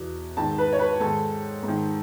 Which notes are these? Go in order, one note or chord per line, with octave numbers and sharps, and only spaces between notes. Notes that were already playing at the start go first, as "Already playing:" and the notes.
Already playing: E2 B2
G#2 D#3 A5
B4
C#5
B4
G#2 D#3 A4
G#2 D#3